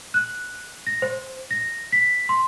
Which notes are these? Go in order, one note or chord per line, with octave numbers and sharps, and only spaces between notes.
F#6
A#6
C5
A#6
B6
C6